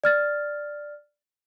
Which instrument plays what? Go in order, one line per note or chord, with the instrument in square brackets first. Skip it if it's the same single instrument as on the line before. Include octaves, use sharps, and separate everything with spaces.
[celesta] D5 F6 A6